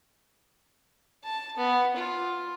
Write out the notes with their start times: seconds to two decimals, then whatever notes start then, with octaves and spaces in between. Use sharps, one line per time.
1.24 A5
1.57 B3
1.97 F4